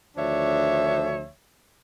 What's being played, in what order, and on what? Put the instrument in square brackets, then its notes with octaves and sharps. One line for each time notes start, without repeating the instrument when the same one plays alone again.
[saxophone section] D2 D#3 F3 D4 C#5 E5